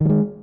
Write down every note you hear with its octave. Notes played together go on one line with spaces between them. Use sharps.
D#3 G3 G#3